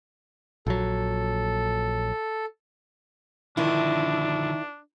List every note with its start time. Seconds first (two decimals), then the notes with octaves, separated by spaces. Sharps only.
0.67 A#1 F#3 A4
3.57 D3 D#3 F3 D4 E4